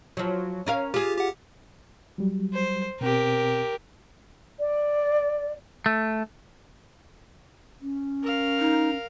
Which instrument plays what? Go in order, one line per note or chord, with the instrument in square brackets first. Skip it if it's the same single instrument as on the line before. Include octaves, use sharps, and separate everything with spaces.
[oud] F3 F#3
C#4 A#4 F5
[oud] F4 G#4 [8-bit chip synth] G4
[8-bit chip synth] G4 F#5
[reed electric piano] F#3 G3
[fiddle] C5
[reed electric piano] B2 C4 [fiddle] G4 A#4
[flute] D5
[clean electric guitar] A3
[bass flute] C#4
[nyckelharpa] A#4 F5
[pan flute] D#4